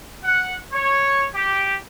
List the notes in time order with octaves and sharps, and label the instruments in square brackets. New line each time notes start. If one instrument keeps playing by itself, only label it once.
[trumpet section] F#5
C#5
G4